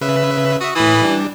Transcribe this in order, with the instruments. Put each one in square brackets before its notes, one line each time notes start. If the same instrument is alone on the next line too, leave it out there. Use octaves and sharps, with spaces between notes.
[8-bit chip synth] C#3 B4 E5
[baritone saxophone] F#4 [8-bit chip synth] E5 D#6
[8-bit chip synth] A2 B5 D#6 [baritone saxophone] E3
[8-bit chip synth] G3 D4